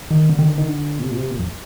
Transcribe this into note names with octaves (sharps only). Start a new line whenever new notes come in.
D#3
D3
D#3
D3
D#3
D3
A#2
C3
A#2
C3
A#2
F2